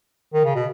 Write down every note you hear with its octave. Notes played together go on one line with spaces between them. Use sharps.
D#3
C#3
B2